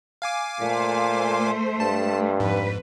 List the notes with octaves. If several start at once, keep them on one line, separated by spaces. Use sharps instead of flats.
F5 G#5 D6
A#2 A3 C5
G2 A5
F2 G#2 B4